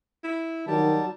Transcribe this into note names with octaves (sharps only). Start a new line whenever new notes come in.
E4
D#3 F#3 G3 A5